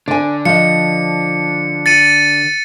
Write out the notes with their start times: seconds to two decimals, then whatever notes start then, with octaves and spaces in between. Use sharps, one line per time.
0.08 D3 D5 G#5
0.45 F3 D#5 C#7
1.86 A6 C#7 D#7